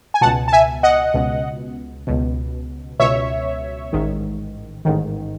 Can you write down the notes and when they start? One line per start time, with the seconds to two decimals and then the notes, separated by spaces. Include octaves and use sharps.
0.14 G#5
0.21 C#2 B2 F#5 A5
0.48 A5
0.53 E5 G#5
0.83 D#5 F#5
1.14 C#2 B2
2.07 C#2 B2
3.00 C#2 B2 C#5 E5
3.93 A1 G#2 D#3
4.85 A1 G#2 D#3